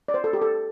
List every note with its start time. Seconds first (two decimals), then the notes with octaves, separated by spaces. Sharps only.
0.08 D5
0.14 C5
0.24 A4
0.33 G4
0.42 A4